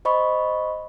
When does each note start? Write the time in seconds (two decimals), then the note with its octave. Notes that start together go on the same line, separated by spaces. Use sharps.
0.05 C5 D#5 B5 C#6